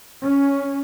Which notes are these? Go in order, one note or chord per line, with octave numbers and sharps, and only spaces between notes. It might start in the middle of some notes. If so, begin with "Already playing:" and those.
C#4